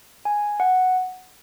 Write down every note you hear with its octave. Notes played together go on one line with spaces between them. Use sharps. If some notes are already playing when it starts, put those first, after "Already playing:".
G#5
F#5